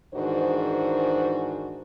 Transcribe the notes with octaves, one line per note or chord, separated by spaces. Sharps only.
G#2 D#3 E3 D4 F#4 C5